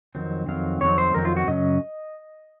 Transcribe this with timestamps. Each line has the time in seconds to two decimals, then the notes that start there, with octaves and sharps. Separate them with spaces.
0.15 F2 D#3 F#3 C4
0.47 F2 D#3 F#3 C4 F5
0.81 F2 D#3 F#3 C4 C#5
0.98 C5
1.14 F2 D#3 F#3 C4 A#4
1.25 F4
1.37 F#4
1.47 F#2 C#3 F#3 C#4 D#5